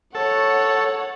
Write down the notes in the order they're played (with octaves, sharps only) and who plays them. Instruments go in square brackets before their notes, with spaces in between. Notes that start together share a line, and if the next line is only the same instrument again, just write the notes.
[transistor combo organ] A4 [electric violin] C#5 F#5